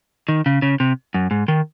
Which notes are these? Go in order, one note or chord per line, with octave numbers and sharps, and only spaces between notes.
D#3
C#3
C#3
C3
F#2
G#2
D#3